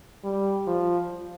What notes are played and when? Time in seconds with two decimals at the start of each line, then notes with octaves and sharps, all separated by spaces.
0.24 G3
0.67 F3